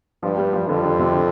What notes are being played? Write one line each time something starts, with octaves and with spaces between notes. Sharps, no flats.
G2 F3
G3
F3
F2 D3
D3
C3
D3